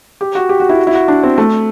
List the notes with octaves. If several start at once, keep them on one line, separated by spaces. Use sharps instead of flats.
G4
F#4
G4
F#4
E4
F#4
E4
F#4
D4
C4
A3